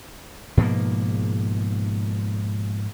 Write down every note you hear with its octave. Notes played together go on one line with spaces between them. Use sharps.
G#2 B2 F3 A#3